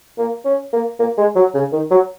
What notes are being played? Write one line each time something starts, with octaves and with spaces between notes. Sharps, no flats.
A#3
C#4
A#3
A#3
G#3
F#3
C#3
D#3
F#3